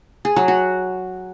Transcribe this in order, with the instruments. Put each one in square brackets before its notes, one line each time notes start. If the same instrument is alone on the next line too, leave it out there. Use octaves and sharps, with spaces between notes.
[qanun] G#4
F#3
F#4